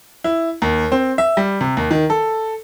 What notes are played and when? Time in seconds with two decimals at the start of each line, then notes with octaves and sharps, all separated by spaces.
0.24 E4
0.62 D#2
0.92 C4
1.18 E5
1.37 G3
1.61 C3
1.77 D#2
1.91 D#3
2.10 A4